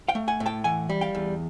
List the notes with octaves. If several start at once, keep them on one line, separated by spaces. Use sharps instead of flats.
F5 G5
A3
F#5 G#5
A2
G5 A5
E3 F#5 G#5
G3
F5 G5
E2